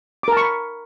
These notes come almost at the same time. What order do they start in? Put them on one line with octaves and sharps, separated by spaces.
D6 A#4 A5 C#6 B5